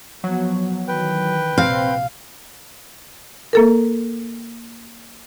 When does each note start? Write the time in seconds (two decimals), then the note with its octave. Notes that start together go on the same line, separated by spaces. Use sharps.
0.24 F3 F#3 B3
0.88 D#3 E3 B4 G5
1.58 A#1 C3 C4 F5
3.53 A#3 A4 A#4